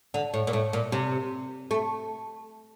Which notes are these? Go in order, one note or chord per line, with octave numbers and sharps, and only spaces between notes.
D3
A2
A#2
A2
A#2
C3
A3